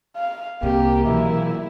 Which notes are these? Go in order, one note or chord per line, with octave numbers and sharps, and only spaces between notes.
F5
C2 C3 A#3 G4
B2 E3 F#3 E4